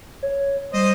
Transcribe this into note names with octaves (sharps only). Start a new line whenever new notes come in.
C#5
G3 C5 D#5